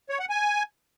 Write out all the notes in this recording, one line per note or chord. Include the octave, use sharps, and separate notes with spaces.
C#5
F#5
G#5